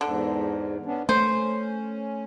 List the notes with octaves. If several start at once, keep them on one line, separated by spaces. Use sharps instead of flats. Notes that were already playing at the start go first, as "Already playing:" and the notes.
E2 G#2 D3
B3 C#4 D4
A3 C#4 C5